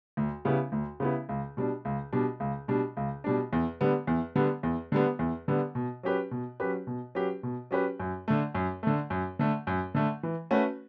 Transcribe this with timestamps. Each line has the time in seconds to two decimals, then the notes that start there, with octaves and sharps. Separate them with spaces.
0.17 D2
0.45 C#3 G3 B3 E4
0.72 D2
1.00 C#3 G3 B3 E4
1.29 C#2
1.57 B2 G3 D4
1.85 C#2
2.13 B2 G3 D4
2.40 C#2
2.68 B2 G3 D4
2.97 C#2
3.24 B2 G3 D4
3.53 E2
3.81 D3 G3 B3
4.07 E2
4.36 D3 G3 B3
4.63 E2
4.92 D3 G3 B3
5.19 E2
5.48 D3 G3 B3
5.75 B2
6.03 F#3 C#4 G4 B4
6.31 B2
6.60 F#3 C#4 G4 B4
6.87 B2
7.15 F#3 C#4 G4 B4
7.43 B2
7.71 F#3 C#4 G4 B4
8.00 F#2
8.28 D3 A3
8.55 F#2
8.83 D3 A3
9.10 F#2
9.39 D3 A3
9.67 F#2
9.95 D3 A3
10.23 E3
10.51 A3 C#4 F#4 B4